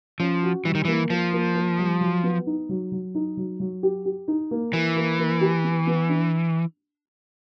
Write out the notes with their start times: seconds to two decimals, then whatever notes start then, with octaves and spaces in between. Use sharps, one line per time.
0.20 F3 C#4
0.43 F#4
0.65 E3 G3
0.75 D#3
0.85 E3 A#3
1.10 F3 A#3
1.33 A#3
1.55 A#3
1.78 G3
2.01 F#3
2.23 B3
2.47 D#4
2.69 F#3
2.92 F#3
3.15 D#4
3.37 F#3
3.60 F#3
3.83 G4
4.05 G4
4.28 D#4
4.51 A#3
4.73 E3 A#3
4.96 A#3
5.19 A#3
5.41 G4
5.64 B3
5.87 B3
6.09 D4